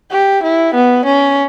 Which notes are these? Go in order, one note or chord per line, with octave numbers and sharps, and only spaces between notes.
G4
E4
B3
C#4